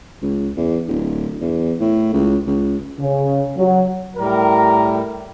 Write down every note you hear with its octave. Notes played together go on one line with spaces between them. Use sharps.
C#2
E2
D1
E2
A2
C#2
C#2
C#3
F#3
A2 G3 A#4